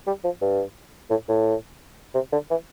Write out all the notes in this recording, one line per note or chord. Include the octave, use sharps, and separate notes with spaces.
G3
F3
G2
A2
A2
C3
D3
E3